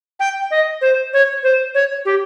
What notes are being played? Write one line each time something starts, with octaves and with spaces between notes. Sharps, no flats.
G5
D#5
C5
C#5
C5
C#5
G4